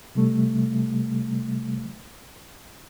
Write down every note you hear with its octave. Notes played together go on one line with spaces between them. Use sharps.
C3 G3 A3